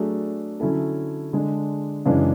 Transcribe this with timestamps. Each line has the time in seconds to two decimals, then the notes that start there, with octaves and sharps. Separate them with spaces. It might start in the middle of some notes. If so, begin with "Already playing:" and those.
Already playing: F#3 A3 D4 G#4
0.60 D3 F#3 C#4 E4 A4
1.33 D3 G#3 D4 G#4
2.05 F#2 C#3 E3 G#3 D4